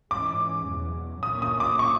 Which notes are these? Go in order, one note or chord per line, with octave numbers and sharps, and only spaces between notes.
G#2 E3 G#3 C#4 D6
E2 B2 F#3
B1 A#2 F#3 A#3 C#4 D#6
D#6
D6
C#6